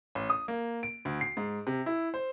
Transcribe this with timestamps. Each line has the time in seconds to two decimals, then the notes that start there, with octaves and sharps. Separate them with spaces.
0.15 A1
0.30 D#6
0.48 A#3
0.83 D7
1.05 D2
1.21 C7
1.37 G#2
1.67 C3
1.86 E4
2.14 C5